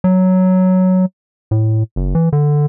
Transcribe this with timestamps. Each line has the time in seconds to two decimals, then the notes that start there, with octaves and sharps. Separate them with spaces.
0.04 F#3
1.51 A2
1.96 F#1
2.15 E3
2.33 D3